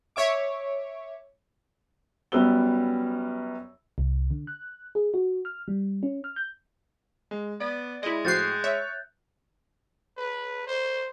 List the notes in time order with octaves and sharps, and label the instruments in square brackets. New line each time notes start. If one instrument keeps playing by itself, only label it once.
[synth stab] C#5 E5 D6
[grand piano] F#2 G3 B3 E6 G7
[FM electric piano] C2
D3
F#6
G#4
F#4
F6
G3
C#4
F6
G6
[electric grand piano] G#3
[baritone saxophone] B3 [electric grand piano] D5
[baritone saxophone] G#3 [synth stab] E4 D#5
[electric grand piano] A2 [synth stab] F3 F#4 C7 [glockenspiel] F#6 G6 A6
[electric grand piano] C#5 [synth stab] E5
[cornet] B4
C5